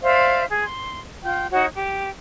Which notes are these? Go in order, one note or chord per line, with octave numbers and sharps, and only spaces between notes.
C5 D5 E5 F5
G#4
C6
F4 G5
D#4 F#4 C#5
G4